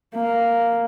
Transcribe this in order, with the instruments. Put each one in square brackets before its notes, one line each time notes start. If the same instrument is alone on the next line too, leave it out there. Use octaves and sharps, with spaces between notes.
[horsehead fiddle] A#3